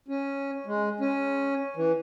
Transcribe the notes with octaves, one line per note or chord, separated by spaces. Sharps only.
C#4
G#3
C#4
E3